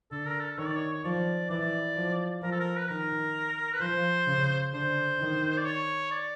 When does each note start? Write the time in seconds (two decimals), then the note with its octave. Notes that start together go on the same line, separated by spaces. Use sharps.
0.11 D3 A4
0.27 A#4
0.40 A4
0.58 D#3 C#5
0.67 D5
0.76 C#5
0.93 C#5
1.04 F3 D5
1.50 E3 D5
1.97 F3
2.42 F3 A#4
2.52 A4
2.60 A#4
2.78 B4
2.88 D#3 A#4
3.73 B4
3.81 F3 C5
4.27 C#3
4.73 D3 C5
5.20 D#3
5.58 D5
5.65 C#5
6.11 D5